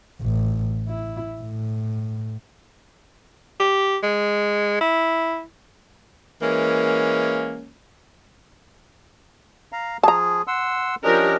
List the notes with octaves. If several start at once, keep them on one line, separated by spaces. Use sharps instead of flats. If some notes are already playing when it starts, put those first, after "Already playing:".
A1
E4
A2
G4
G#3
E4
E3 G#3 A#3 C#4
F5 A#5
F3 G#4 A5 A#5
F#5 C6 E6
F3 C#4 D4 G4 A#4 D#5